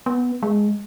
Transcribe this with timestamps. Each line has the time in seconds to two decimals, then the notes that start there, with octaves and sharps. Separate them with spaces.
0.06 B3
0.43 G#3